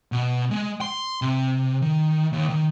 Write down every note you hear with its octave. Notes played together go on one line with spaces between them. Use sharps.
B2
G#3
C6
C3
D#3
D#2
D#3